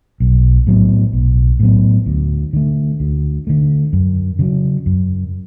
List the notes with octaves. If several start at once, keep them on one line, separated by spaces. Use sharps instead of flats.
B1
A2 F#3 B3
B1
A2 F#3 B3
D2
D3 A3
D2
D3 A3
F#2
C#3 F#3
F#2